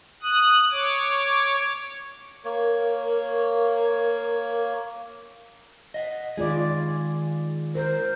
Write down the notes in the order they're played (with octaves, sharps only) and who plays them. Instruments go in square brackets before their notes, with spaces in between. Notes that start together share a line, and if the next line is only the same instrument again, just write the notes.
[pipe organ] D#6 F#6
C#5 D6
[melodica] A#3 C#5 [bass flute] A#4
[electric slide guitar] D#5 F#5
[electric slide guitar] D#3 G#4 [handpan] G#3 F4 D5
[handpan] A#4 [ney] C5